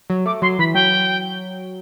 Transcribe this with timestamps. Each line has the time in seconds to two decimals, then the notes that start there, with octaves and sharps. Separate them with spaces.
0.10 F#3
0.26 A3 D6
0.42 F#3 C6
0.59 E3 B5
0.74 F#3 G5